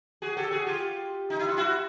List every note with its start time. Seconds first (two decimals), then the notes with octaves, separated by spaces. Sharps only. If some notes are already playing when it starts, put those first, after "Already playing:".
0.22 F#4 G#4
0.37 G4 A4
0.51 F#4 G#4
0.67 F4 G4
1.30 D#4
1.39 E4
1.48 F4
1.57 E4 F#4